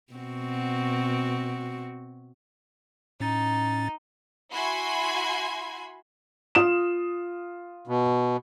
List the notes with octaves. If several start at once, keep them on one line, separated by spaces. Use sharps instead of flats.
B2 C4 F#4
A2 C#4 D#4 A6
E4 F#4 G#5 B5 C6 G#6
F4 D#6 E7
B2